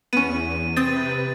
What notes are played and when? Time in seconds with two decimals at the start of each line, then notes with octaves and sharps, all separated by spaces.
0.13 E2 B3 C#4 D#7
0.77 C3 C4 B4 D#6 A6 D#7